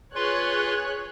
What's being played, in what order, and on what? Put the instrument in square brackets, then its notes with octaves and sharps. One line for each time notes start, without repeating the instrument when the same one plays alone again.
[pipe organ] F4 B4 C6 [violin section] G#4 C#5 F#6